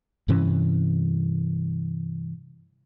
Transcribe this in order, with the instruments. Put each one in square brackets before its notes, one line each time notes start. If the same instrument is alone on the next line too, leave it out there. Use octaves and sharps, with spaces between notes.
[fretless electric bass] G2 C3 E3 C#4